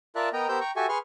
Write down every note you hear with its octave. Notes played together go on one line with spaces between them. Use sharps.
F4 A#4 D5 E5 A5 F#6
B3 A#4 D#5 G5 A#5
B3 G4 A#4 C5 E6 G6
G5 A#5 C#6
F#4 G4 A4 E5 G#5 C#6
G#4 B4 C6 C#6 F6